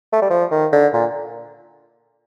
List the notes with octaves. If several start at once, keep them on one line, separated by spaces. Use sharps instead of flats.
A3
G3
F3
D#3
D3
A#2